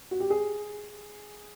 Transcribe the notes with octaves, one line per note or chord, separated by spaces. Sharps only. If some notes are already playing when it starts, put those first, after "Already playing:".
F#4
G4
G#4